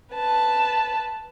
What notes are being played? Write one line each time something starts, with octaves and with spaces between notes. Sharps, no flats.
B4 A5